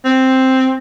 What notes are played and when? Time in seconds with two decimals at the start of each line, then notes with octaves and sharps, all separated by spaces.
0.05 C4